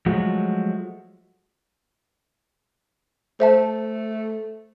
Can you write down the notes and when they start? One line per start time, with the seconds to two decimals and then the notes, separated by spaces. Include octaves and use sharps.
0.06 F3 F#3 G#3 A3 F#4
3.40 A3 C5 E5 A5